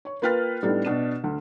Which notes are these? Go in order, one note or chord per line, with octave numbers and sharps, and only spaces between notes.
C#5 C#6
A#3 F4 B4 G5 F6 A6
A2 G3 B3 D4 D#4 A4
B2 D4 E7
D2